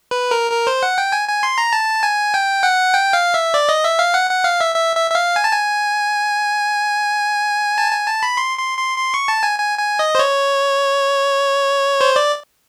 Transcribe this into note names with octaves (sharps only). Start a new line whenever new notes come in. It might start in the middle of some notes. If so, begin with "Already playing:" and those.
B4
A#4
A#4
C5
F#5
G5
G#5
G#5
C6
A#5
A5
G#5
G5
F#5
G5
F5
E5
D5
D#5
E5
F5
F#5
F#5
F5
E5
E5
E5
E5
F5
G#5
A5
G#5
A5
G#5
A5
B5
C6
C6
C6
C6
C#6
A5
G#5
G#5
G#5
D#5
C5
C#5
C5
D5